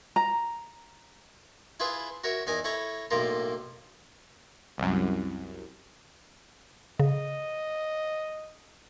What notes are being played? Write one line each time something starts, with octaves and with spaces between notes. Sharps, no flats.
A#5
E4 F4 G#4 B4 E5
F#4 A#4 C#5 E5
E2 D#4 A#4 G#5
E4 A4 C#5 A#5 C#6
B1 A2 A#3 F4 A#4
C2 F#2
C#3 D#5